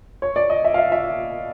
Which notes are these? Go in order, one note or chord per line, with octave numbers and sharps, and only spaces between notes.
C#5
D5
D#5
E5
F5
E5
E5